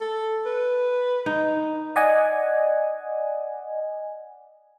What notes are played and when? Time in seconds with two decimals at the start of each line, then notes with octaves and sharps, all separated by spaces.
0.01 A4
0.46 B4
1.26 D#4
1.96 D5 D#5 F#5 G#5